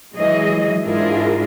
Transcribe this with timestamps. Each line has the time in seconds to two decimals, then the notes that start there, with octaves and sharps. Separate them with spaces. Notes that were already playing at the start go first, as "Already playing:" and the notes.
0.15 E3 F#3 G#3 G#4 D#5
0.85 G#2 D4 E4 F4 G#4 A#4